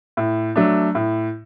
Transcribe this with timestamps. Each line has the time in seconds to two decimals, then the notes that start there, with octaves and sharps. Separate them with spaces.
0.17 A2
0.56 F#3 A3 D4
0.95 A2